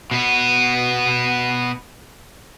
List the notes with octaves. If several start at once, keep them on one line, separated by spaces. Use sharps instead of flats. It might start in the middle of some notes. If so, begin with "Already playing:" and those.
B2 B3